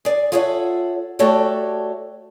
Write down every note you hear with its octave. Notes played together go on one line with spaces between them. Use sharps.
G#4 D5
F4 G#4 A4 C#5 E5 F#5
A3 F#4 G4 A4 C#5 D5